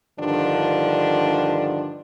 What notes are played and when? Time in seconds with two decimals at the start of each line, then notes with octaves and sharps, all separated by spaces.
0.20 G2 D3 D#3 F3 D4